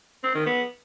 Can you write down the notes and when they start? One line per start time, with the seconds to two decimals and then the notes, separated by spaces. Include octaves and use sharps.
0.23 C4
0.35 D#3
0.46 B3